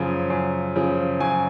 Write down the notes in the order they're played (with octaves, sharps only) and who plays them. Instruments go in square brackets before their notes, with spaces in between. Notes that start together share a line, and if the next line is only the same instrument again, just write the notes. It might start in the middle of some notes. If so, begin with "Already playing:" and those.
Already playing: [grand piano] F#2 C#3 F3
F#2
C#3 F3
F#2 G#5